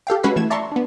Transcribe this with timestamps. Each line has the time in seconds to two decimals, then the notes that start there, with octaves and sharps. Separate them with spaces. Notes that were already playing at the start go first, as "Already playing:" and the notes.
0.07 G4 A4 F5 G5
0.23 G#3 C#4 F#4 B4 B6 C7
0.36 E3 A3 G#6 E7
0.50 D5 E5 A5 A#5 C6 C#6
0.72 B3 D4